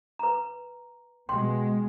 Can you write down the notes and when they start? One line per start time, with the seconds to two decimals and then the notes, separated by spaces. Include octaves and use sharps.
0.19 B4 A#5
1.29 B2 G#3 G5 C6